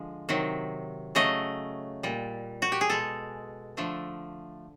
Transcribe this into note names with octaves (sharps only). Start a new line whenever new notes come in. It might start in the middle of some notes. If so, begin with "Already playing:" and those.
Already playing: D3 F3 G#3
C3 D#3 F#3
C#3 F#3 A3 D#5
A#2 G3
F#4
G4
G#4
B2 G#3 A4
D3 F3 A3